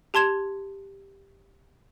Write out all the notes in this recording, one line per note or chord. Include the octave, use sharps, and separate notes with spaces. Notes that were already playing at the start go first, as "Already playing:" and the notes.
G4 A5 C6 G#6 E7